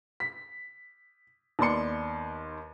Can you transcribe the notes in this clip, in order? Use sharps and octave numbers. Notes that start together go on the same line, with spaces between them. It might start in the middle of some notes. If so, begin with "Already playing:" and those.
B6
D#2 B3 D5 C6 C#7